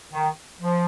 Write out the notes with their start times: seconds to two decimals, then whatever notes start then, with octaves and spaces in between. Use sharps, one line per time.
0.13 D#3
0.61 F3